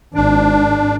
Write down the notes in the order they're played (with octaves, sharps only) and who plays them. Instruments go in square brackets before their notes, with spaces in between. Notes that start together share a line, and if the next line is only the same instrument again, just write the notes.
[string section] G#1 [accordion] D4